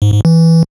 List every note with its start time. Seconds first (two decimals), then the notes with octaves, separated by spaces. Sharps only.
0.02 G#2
0.13 G#2
0.25 E3